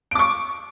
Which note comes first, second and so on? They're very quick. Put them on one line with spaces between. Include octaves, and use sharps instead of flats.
D7 D6 C#6